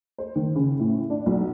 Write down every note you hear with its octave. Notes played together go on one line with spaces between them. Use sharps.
C5
D#3
C#3
A2
D4
B1